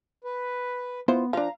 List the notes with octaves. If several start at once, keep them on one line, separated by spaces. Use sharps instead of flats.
B4
B3 E4 F4 C5
F3 D4 F5 A#5